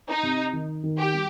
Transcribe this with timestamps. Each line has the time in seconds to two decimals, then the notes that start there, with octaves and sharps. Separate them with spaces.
0.08 D#4
0.23 C3
0.53 D#3
0.83 D#3
0.99 G4
1.14 G3